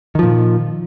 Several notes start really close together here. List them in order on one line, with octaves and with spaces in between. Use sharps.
D#3 F3 A#2